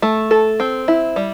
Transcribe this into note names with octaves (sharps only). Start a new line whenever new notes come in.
A3
A4
C4
E4
G3